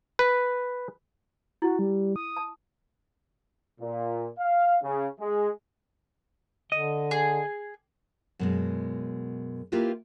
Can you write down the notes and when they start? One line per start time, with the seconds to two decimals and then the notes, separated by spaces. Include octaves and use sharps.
0.19 B4
1.62 E4 F#4
1.79 G3
2.16 D#6
2.37 A5
3.81 A#2
4.38 F5
4.82 C#3
5.20 G#3
6.72 D3 D#5
7.11 G#4
8.39 F#2 B2 G#3
9.72 A#3 E4 F4 G4 A#4 B4